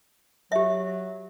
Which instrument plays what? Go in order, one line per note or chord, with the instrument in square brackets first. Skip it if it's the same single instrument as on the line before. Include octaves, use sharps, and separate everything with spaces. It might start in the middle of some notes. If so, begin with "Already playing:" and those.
[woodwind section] F#3 [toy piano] G4 E5